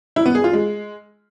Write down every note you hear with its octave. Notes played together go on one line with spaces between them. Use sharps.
E4
B3
G#4
F4
G#3